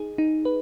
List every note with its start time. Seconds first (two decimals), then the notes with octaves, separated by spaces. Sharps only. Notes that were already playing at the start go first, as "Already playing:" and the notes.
Already playing: D#4 G#4
0.18 D#4
0.45 B4